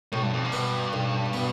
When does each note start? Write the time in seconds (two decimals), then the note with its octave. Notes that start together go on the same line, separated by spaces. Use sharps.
0.12 B1 A2
0.23 G2
0.33 F2
0.45 G2
0.52 B2 B3
0.93 B1
1.33 B2 B3